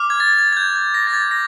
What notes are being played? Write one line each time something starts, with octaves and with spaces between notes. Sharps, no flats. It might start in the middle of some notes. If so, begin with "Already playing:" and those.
Already playing: D6 F6
G#6
A6
A6
G#6
G#6
G6
G#6
A#6
A6
G#6
A#6